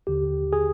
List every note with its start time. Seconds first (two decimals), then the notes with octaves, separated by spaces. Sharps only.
0.07 D#2 D3 G4
0.53 G#4